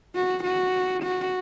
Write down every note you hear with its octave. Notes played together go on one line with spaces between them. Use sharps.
F#4
F#4
F#4